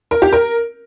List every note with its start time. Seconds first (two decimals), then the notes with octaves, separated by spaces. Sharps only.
0.11 A#4
0.22 G4
0.33 A#4